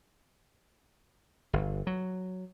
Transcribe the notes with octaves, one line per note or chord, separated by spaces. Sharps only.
G1
F#3